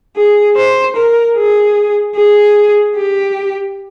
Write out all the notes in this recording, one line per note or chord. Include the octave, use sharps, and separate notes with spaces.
G#4
C5
A#4
G#4
G#4
G4